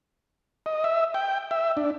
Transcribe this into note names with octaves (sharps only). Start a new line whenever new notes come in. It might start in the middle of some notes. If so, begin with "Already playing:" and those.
D#5
E5
G5
E5
D4